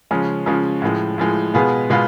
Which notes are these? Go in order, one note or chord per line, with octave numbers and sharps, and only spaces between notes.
C#3 F3 G#3 C#4
C#3 F3 G#3 C#4
A2 F3 G#3
A2 F3 G#3
B2 G#3 B3 F4 G#4
B2 G#3 B3 F4